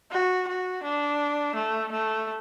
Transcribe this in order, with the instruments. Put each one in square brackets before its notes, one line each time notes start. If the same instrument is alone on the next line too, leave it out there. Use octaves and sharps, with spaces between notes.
[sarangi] F#4
F#4
D4
A3
A3